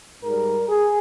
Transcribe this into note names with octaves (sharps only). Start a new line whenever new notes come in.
G#2 G3 A#4
G#4